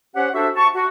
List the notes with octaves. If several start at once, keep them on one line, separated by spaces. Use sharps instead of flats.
C#4 G4 C5 C#5 F#5
D4 F#4 A4 C5 E5
A5 C#6
F#4